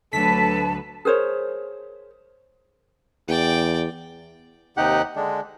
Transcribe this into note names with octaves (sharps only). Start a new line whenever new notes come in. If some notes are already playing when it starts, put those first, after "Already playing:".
D2 F#3 A4 B4 A5 B6
G#4 A#4 C5 C#5
E2 D5 G5
D#2 C3 D#4 G4 F#5
D3 G#3 D4